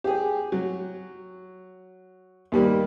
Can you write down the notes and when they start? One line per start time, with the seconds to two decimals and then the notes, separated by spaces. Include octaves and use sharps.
0.04 G4 G#4
0.52 F#3
2.52 D#2 G3 A#3